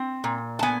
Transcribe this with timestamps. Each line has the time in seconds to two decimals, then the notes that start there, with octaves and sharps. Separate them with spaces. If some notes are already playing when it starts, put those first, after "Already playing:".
Already playing: C4
0.24 A#2
0.59 A5
0.63 B3 G#5